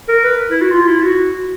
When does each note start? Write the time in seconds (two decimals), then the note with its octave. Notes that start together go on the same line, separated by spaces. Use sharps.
0.08 A#4
0.24 B4
0.51 E4
0.61 F#4
0.71 F4
0.88 E4
1.02 F#4